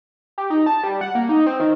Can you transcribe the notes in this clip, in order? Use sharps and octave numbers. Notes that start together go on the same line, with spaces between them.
G4
D#4
A5
G3
F#5
A#3
D#4
C4
D#3